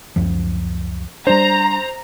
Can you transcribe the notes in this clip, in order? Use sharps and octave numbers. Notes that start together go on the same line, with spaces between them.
C#2 F#2 F3
G3 D4 C5 A#5